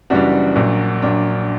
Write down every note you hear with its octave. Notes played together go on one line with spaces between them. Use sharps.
F#1 F#2 E3 G3 D4 F#4
A#1 A#2 F#3
A#1 A#2 F#3 D4